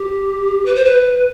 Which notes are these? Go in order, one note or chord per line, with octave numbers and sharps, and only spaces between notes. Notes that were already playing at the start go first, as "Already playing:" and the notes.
Already playing: G4
B4
C5
B4